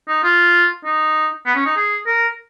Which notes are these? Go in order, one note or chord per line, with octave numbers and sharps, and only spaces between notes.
D#4
F4
D#4
B3
C#4
D#4
G#4
A#4